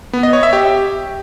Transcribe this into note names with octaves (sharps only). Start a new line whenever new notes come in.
B3
D#5
C#5
E5
G4